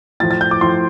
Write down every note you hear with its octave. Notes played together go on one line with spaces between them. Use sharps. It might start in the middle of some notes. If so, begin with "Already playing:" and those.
A2 F3 A6
A6
G6
D6
A2 F3 C6